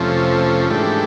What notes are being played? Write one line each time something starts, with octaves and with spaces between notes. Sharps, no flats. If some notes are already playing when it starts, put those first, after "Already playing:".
Already playing: F2 C3 F3 A3 C#4
G#2 E3 A3 D4 G4